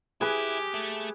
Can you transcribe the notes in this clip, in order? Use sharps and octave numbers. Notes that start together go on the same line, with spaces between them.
E4 G4 G#4 B4 G#5
A3